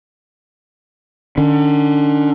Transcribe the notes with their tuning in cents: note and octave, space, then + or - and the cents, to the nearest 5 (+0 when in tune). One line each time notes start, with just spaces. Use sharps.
D3 +40 C#4 +40